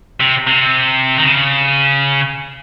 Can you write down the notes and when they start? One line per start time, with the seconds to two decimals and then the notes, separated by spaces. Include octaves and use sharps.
0.20 C3
0.47 C3
1.17 D#3
1.25 C#3